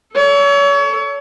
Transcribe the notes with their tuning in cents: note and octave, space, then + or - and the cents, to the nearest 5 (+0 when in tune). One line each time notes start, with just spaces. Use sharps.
A4 +0 C#5 +35